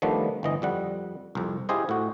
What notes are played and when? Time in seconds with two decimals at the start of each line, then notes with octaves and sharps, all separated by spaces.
0.02 D#3 F3 G3 A3 B3 D4
0.43 G1 E3 D#5
0.62 F2 G3 F#5
1.35 C2 F2
1.69 E4 F4 G4 G#4 C5 D#5
1.89 A2 F#4